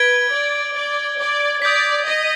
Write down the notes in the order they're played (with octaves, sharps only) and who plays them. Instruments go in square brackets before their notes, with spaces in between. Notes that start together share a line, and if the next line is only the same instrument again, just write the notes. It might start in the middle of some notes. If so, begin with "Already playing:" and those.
Already playing: [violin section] B4 [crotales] G#6 D7 G7
[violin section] D5
D5
D5
[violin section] D5 [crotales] D#6 G6 B6
[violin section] D#5